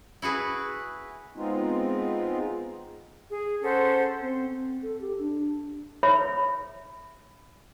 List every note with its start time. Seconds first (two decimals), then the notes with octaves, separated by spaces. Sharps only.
0.22 E4 F#4 G#4 B4
1.36 G#3 B3 C4 D#4 F4
3.29 G#4
3.61 C#4 A4 C5 F#5
4.22 C4
4.50 C4
4.82 A4
5.01 G4
5.19 D4
6.03 C#5 E5 B5